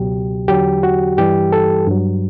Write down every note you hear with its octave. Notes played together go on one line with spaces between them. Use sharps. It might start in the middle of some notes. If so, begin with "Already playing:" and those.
Already playing: C#2 B2 F#3 G4
E2 D3 F#3 G4
F#4
G2 E3 G3 G4
A4
G2 F#3